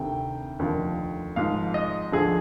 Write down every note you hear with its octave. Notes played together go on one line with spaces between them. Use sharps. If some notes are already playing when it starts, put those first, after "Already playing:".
Already playing: D2 C3 D#3 G5
F1 D#2 D3 F3
G#1 G#2 F3 F5
D#5
D2 D3 F3 G#4